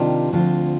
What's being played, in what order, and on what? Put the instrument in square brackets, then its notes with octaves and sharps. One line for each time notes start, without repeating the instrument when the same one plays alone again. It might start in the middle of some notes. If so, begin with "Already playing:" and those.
Already playing: [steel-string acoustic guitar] C3 D#3 G3 D4 F4
D2 D3 F3 C4 F4